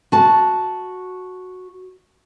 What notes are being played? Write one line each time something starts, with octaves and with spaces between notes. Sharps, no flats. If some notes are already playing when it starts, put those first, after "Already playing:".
F#4 A5